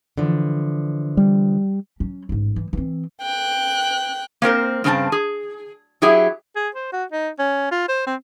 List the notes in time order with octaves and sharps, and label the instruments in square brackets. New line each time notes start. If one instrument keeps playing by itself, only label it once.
[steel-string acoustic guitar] D3 E3 F3
[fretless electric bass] G3
[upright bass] F#3 C#4
A1 G#2
E3
E3 C4
[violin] G5 F#6
[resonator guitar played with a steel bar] A#3 C4 A#4 C5
G2 C#3 C4 G#5 A5
G#4
F#3 E4 G4 G#4 E5
[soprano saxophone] G#4
C5
F#4
D#4
C#4
F4
C5
C4